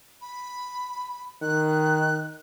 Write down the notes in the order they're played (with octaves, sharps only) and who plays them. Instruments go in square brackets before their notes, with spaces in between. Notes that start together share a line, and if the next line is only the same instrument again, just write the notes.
[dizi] B5
[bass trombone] D#3 [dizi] F#6